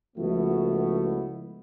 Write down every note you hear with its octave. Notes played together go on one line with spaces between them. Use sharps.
C#2 F3 A3 B3 E4 F#4